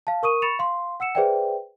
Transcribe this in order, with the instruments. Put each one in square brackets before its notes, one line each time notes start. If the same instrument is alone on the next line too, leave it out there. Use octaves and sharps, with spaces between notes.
[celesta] F5 A5
A#4 C#6 D#6 D#7
B5 C#6 A6 C#7 E7 F7
F5 C6
F#5 E6 C#7 E7
G#4 B4 C5 D5 E5 G5